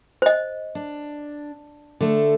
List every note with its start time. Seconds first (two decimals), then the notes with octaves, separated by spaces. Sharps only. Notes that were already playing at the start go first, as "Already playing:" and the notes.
0.22 C5 D#5
0.75 D4
2.00 D3 A3